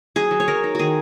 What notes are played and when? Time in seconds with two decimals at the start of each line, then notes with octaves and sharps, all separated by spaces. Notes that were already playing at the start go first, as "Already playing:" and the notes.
0.16 F#3 G#4
0.31 F#3
0.40 C#5
0.48 F#3 A#4
0.64 D#4
0.75 D#3 F#4 G#4